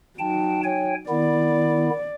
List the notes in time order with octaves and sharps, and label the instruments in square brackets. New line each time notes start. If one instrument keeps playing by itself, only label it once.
[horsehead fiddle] F#3 D#4 [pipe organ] G5 A5
[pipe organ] C#5 G5 G#5
[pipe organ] D#3 B3 E4 [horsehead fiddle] D5